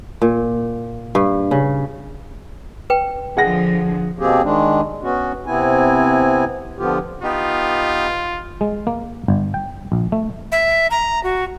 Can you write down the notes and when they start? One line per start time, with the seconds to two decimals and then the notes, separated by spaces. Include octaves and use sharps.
0.22 A#2
1.15 G2
1.51 C#3
2.90 B4 G5
3.37 D3 F3 G#4 F#5 A#6
4.19 B2 A#3 C4 G4 G#4
4.43 D#3 G#3 D4
5.03 B3 C#4 F#4
5.46 C3 B3 C4 E4 G#5
6.79 D3 F3 B3 F4 G4
7.23 B3 D#4 F4 G4
8.61 G#3
8.87 A#3
9.28 G1
9.54 G5
9.92 A#1
10.12 A3
10.52 E5
10.91 A#5
11.24 F#4